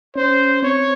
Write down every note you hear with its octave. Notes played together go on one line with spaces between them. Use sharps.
C#4 C5
C4 C#5